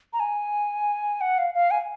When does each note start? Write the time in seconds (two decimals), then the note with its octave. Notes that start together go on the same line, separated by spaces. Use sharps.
0.13 A#5
0.20 G#5
1.21 F#5
1.38 F5
1.54 F5
1.71 G#5